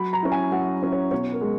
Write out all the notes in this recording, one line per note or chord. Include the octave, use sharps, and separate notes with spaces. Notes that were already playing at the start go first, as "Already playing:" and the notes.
Already playing: F#3 B5
A#5
C#4 E4
G#5
F#3 F#5
C#4 E4
C#5
B2 C#5
A#4
G#3